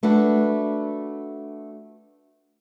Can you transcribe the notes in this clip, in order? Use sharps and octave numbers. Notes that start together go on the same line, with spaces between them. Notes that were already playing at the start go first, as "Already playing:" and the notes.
A3 D4 F#4 B4